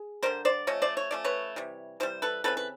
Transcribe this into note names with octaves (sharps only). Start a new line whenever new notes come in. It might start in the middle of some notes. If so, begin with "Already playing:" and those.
Already playing: G#4
D3 G3 B3 A#4 C5
C5 D5
F3 A3 C#4 C#5 D#5
C5 D5
C#5
F3 A3 C#4 D5
B4 C#5
C3 E3 G3
C3 E3 G3 C5
A4 B4
C#3 E3 G3 C4 A4 B4
B4